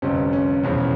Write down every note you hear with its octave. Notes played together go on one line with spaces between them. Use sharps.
G1 F2 C3 F3 C#4
C#4
E1 E2 C#3 F3 C#4